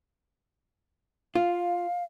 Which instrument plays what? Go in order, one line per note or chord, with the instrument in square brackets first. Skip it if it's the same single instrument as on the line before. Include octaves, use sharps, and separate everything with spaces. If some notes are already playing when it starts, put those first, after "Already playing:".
[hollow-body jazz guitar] F4 [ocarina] F5